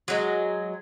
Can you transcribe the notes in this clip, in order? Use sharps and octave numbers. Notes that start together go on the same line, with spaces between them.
F#3 G#3